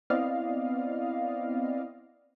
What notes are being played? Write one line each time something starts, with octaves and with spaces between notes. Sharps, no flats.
B3 C4 E4 D5 D#5 F5